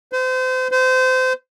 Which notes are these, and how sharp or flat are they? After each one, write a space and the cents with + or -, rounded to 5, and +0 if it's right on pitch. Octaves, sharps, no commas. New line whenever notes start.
C5 -35
C5 -30